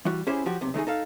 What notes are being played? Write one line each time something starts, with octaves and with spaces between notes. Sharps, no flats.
E3 G3 F#4
C#4 E4 G4 G#4 C5
F3 F#3 F#4 G4
B1 C3
D#3 A3 D#4 G#4
D#4 A4 F5